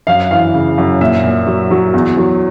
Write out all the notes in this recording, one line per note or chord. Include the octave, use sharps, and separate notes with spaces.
F#2 F5
E3 F5
C#3
F#2
A#2 E5
A#2
F#3
F#3
E2
F#3